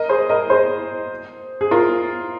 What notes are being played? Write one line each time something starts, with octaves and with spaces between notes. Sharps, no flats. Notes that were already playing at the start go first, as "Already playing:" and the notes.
Already playing: A#4 D#5
G#4 C5
A#4 D#5
G#4 C5
G#4
F4 A#4